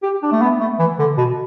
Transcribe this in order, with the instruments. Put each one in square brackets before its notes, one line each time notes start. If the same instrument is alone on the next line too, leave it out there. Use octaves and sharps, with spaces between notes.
[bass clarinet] G4
D4
A3
B3
A3
E3
D3
B2